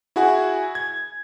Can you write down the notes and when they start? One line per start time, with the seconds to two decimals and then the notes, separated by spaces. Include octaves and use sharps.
0.16 E4 F#4 G#4 F#5 G#5
0.75 G#6